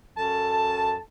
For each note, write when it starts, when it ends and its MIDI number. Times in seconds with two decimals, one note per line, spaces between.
0.17 0.99 42
0.17 0.99 69
0.17 0.99 81